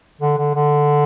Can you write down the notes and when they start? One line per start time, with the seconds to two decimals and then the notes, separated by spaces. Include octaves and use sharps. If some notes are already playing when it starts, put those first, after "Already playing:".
0.21 D3
0.38 D3
0.55 D3